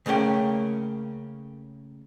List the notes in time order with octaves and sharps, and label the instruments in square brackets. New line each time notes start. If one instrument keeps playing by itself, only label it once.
[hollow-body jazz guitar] C#3 A3 A#3 C#4 G5